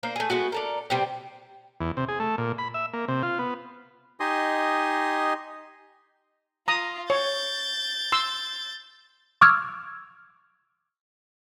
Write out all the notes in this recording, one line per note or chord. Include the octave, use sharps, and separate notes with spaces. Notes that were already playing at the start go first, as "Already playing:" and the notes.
A#3 D4 C5
A3 G#4
G#3 A3 B3 F#4
D4 A4 A#4
C3 G3 B3 C4
E2
C3
G#4
A3
A#2
B5
E5
A#3
C3
F4
B3
D#4 G4 D#5 G#5 C6 D#6
F4 A#5 D#6
C#5 G6 A6
C6 E6
C#6 D6 E6 F6 G#6